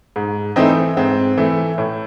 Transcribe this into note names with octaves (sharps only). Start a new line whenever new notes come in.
G#2
E3 A3 C4 D#4
G#2 C4
E3 A3
A2